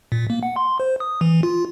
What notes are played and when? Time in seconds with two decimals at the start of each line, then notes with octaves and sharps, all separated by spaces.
0.12 A#2
0.30 A#3
0.43 F#5
0.56 C6
0.80 C5
1.00 D#6
1.21 E3
1.43 F4